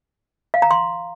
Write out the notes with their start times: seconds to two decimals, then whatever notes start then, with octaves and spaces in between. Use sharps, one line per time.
0.54 F5
0.62 A#5
0.71 C6